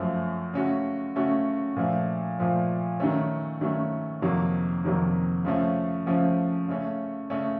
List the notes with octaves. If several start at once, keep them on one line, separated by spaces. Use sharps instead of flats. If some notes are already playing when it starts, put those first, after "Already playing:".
Already playing: F#2 F3 A3
C#3 A3 C#4 F#4
C#3 A3 C#4 F#4
A#2 F3 A3
A#2 F3 A3
D#3 F#3 A3 C#4
D#3 F#3 A3 C#4
F2 C3 D#3 F#3 A#3
F2 C3 D#3 F#3 A#3
C#3 F3 A3 C#4
C#3 F3 A3 C#4
C#3 A3 C#4
C#3 A3 C#4